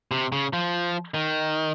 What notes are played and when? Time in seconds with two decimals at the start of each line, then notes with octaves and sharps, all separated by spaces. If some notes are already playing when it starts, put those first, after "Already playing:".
0.11 C3
0.32 C#3
0.53 F3
1.14 D#3